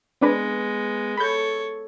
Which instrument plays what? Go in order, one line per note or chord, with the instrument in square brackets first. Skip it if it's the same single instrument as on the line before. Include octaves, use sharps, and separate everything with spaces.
[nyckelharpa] G#3 B3 [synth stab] C4 D4 B4
[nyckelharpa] A4 C#5 [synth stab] B5 G6